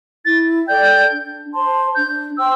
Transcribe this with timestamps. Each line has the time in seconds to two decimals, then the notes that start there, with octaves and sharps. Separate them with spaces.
0.25 E4 A6
0.68 A4 D5 G5 G6
1.10 D4
1.53 C5 A5 C6
1.95 D4 G6
2.37 C5 G5 C6 E6